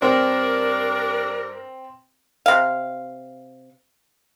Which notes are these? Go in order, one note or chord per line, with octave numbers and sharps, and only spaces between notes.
G2 C4 D4 A#4
C3 F5